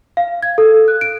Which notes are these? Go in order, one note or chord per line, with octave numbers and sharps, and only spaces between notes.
F5
G#6
A4
F#6
D7